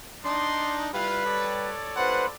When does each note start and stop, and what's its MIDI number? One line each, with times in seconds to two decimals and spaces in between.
0.24 0.88 62
0.24 0.88 63
0.24 0.82 74
0.24 0.82 84
0.93 1.70 55
0.93 1.23 64
0.93 1.23 65
0.93 1.70 71
0.93 1.23 77
1.25 2.35 69
1.25 2.35 73
1.25 2.35 74
1.97 2.24 43
1.97 2.24 46
1.97 2.25 71
1.97 2.25 72
1.97 2.24 78